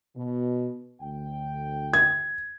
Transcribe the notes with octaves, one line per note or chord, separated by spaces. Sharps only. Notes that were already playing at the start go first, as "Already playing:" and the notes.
B2
D2 G5
G#6